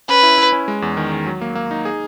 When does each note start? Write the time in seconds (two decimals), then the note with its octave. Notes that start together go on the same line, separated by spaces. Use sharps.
0.09 C#4 B4
0.23 E4
0.38 E4
0.52 C#4
0.68 G#3
0.82 E2
0.97 D#3
1.12 D#3
1.26 F#3
1.41 A#3
1.55 A#3
1.71 D#4
1.85 G#4